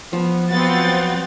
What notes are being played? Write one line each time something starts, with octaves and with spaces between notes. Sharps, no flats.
F3 B3
F#3 B3 C4 F4 F#5 A6